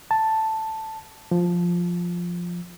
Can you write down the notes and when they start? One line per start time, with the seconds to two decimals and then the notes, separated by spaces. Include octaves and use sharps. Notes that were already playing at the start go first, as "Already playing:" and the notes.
0.11 A5
1.31 F3